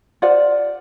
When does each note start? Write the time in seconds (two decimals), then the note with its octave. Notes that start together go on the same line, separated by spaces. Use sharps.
0.22 F4 C5 D5 F#5